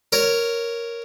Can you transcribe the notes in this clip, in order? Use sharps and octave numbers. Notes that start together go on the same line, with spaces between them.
A#4 C#5